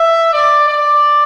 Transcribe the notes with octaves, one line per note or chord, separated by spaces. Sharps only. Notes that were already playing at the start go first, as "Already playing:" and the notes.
Already playing: E5
D5
D5